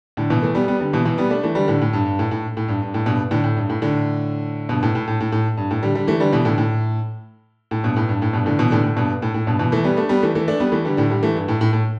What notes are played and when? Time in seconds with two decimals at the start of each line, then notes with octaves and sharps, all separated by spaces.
0.17 A2 D3
0.30 B2 E3
0.42 E3 A3
0.55 G3 B3
0.68 G3 B3
0.80 D3 G3
0.93 B2 E3
1.05 B2 E3
1.18 G3 B3
1.30 A3 D4
1.43 E3 A3
1.55 D3 G3
1.68 A2 D3
1.81 A2
1.93 G2
2.05 G2
2.19 A2
2.31 A2
2.57 A2
2.68 G2
2.82 G2
2.94 A2
3.06 G2 B2
3.31 A2 D3
3.44 A2
3.56 G2
3.69 A2
3.82 A2 D3
4.69 G2 B2
4.83 A2
4.95 A2
5.08 A2
5.20 A2
5.32 A2
5.57 G2
5.71 A2
5.83 D3 G3
5.95 D3 G3
6.07 E3 A3
6.20 D3 G3
6.33 B2 E3
6.45 A2 D3
6.58 A2
7.71 A2
7.83 G2 B2
7.96 A2
8.09 G2
8.22 A2
8.33 G2 B2
8.46 A2 D3
8.59 B2 E3
8.71 A2 D3
8.83 A2
8.97 G2 B2
9.22 A2
9.34 A2
9.47 G2 B2
9.59 B2 E3
9.72 E3 A3
9.84 G3 B3
9.97 A3 D4
10.09 G3 B3
10.23 E3 A3
10.35 E3 A3
10.48 A3 D4
10.60 G3 B3
10.72 E3 A3
10.85 D3 G3
10.97 A2 D3
11.10 D3 G3
11.23 E3 A3
11.35 G2
11.48 A2
11.61 A2
11.73 A2